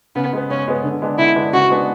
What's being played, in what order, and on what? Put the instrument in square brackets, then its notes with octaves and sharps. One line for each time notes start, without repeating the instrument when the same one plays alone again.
[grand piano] C#3 [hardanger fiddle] B3
[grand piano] G#3 B3
[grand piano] C#3 [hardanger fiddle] C#4
[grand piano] G#3 B3
D3
G#3 B3 D4
[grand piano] D3 [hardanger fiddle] E4
[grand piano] G#3 B3 D4
[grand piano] C#3 [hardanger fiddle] F#4
[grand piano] G#3 B3 D4